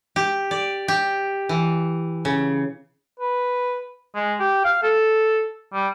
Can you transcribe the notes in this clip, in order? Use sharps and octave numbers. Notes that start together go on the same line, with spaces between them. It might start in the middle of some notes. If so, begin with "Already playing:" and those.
G4
D5
G4
E3
C#3
B4
G#3
G4
F5
A4
G3